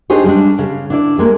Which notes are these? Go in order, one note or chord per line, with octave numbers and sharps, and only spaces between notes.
D4 D#4 G4 G#4 C5 C#5
G3 G#3 D4
C#3
D4 E4 D5
G3 G#3 A#3